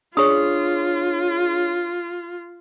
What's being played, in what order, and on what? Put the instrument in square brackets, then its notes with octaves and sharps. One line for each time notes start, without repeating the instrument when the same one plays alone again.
[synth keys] D4 G#4 C#5 [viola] F4 [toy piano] C#6 D#6